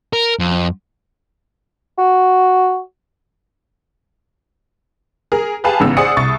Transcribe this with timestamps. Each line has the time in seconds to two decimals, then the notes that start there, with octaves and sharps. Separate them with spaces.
0.13 A#4
0.39 F2
1.98 F#4
5.32 G#4 A#4
5.64 G4 G#4 B4 F5 G#5 A5
5.80 A1 G#2 C#3 B3 E6
5.97 G#4 C5 D5 F#5 D#6 C#7
6.17 C2 C#6 A6